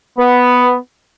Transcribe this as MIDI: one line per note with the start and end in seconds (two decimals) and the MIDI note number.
0.18 0.77 59